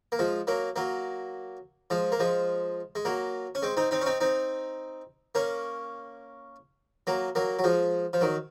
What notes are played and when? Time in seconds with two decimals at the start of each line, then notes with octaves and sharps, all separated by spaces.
0.12 A#3
0.19 F3 G#3
0.47 F#3 A#3
0.76 F#3 A#3
1.90 F3 G#3
2.12 A#3
2.19 F3 G#3
2.95 G#3
3.05 F#3 A#3
3.55 C#4
3.62 G#3 C4
3.77 C4 D#4
3.91 C4 D#4
4.01 C#4
4.06 C4 D#4
4.21 C4 D#4
5.35 A#3 C#4
7.07 F#3 A#3
7.35 F#3 A#3
7.59 F#3
7.64 F3 G#3
8.13 F3
8.21 D#3 F#3